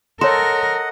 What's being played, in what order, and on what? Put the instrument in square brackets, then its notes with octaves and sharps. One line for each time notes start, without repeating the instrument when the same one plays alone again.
[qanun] A4 [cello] A#4 [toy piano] C#5 C6 [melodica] D#5 F#5